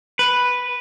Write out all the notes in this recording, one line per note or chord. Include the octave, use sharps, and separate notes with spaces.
B4